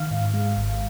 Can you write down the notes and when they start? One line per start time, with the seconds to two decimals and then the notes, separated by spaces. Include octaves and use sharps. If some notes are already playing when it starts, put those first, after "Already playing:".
Already playing: D#3 F5
0.11 G#2
0.34 G#3
0.57 G#1